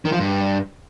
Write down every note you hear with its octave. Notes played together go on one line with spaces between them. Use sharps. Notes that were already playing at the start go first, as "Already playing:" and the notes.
D#3
F3
G2